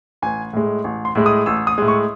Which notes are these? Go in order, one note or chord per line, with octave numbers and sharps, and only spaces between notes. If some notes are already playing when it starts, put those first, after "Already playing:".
A1 G#5
A2 G#3
A1
C6
A2 G#3
D#6
A1 E6
D#6
A2 G#3
C#6